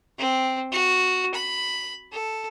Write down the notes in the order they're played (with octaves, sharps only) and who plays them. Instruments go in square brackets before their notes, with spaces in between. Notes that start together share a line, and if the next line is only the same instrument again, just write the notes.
[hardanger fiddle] C4
F#4
B5
A4